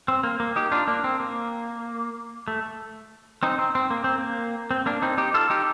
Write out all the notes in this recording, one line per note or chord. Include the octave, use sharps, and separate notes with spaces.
C4
A#3
A#3
D#4 G4
D4 F4
A#3 D4
C4
A#3
A3
C4 D#4
C4
C4
A#3
C4
A#3
C4
A#3 D4
C4 D#4
D#4 G4
F4 A4
D#4 G4